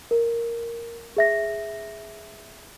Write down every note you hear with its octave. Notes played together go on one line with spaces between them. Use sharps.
A#4
G#4 E5 A#6